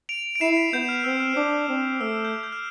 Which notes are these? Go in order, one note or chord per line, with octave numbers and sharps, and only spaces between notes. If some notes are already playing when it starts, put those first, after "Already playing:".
D7 F7
D7
E4 C7 E7
B6 D7
B3 G6
F6
C4 E6
F6
D4 D6
C4
A3 E6
F6
G6
F6
G6
F6